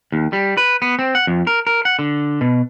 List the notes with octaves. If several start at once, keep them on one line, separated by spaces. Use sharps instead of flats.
D#2
G3
B4
B3
C4
F#5
F2
A#4
A#4
F#5
D3
B2